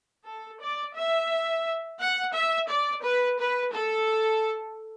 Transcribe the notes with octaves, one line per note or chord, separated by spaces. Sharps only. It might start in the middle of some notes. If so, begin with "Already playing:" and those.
A4
D5
E5
F#5
E5
D5
B4
B4
A4